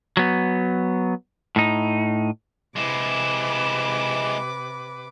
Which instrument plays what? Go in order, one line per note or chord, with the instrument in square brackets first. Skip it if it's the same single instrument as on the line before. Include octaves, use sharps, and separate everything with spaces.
[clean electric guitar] F#3 B3
A2 D#4
[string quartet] C3 B4 D6 [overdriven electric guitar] G#3 E4